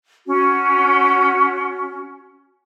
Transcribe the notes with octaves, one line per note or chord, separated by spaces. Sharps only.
C#4 F#4